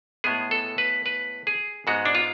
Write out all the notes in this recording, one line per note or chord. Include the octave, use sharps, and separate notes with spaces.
A2 G#3 B3 G#4
A4
B4
B4
G#4
G#2 G#3 B3 F#4
D4
F4